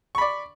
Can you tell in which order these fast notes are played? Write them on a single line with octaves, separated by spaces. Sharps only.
C#6 B5 D5